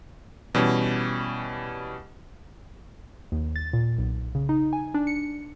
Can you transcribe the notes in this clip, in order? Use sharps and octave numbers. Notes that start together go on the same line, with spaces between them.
B2 E3 G3 C#4
D#2
A6
A#2
B1
C#3
D#4
G#5
D4
C#7